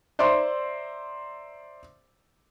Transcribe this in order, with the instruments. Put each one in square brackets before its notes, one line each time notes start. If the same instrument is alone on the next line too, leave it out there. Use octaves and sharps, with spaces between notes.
[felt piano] C5 D5 E5 A#5 C6